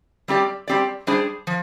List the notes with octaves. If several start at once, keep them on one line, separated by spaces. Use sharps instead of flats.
G3 C4 G4 D5
G3 C4 G4 D5
G3 D4 G#4 C5
F3